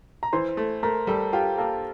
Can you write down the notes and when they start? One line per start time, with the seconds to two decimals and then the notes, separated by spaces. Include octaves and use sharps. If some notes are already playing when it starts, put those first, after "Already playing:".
0.23 A#5
0.33 E3 C5 C6
0.57 A3
0.83 A3 A#4 A#5
1.07 G3 A4 A5
1.33 F4 G4 G5
1.57 A#3 A4 A5